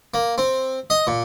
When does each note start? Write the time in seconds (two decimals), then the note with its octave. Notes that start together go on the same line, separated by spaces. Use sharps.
0.14 A#3
0.38 C4
0.90 D#5
1.07 A#2